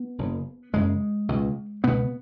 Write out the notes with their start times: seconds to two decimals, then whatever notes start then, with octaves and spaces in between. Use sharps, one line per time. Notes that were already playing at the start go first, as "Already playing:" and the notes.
Already playing: B3
0.18 F#1 F#2 C#3
0.73 F#1 F#2 C#3 G#3
1.29 C#2 B2
1.84 C#2 B2 B3